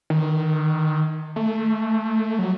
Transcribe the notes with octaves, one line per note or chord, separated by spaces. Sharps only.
D#3
A3
F#3